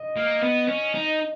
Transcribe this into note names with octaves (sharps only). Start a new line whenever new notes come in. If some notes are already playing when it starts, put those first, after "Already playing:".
Already playing: D#5
A#3
B3
C#4
D#4